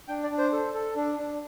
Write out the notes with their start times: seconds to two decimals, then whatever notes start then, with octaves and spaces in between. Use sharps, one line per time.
0.08 D4 G5
0.24 D5
0.30 D4
0.38 C5
0.53 A4
0.74 A4
0.96 D4
1.18 D4